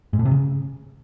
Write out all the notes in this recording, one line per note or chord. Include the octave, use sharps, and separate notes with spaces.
G#2
A2
C3
C#3